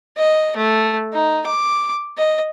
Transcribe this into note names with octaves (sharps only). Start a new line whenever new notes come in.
D#5
A3
D#4
D6
D#5